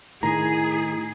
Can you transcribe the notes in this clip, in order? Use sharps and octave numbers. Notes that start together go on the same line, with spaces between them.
A2 D#3 E4 G#4 A#5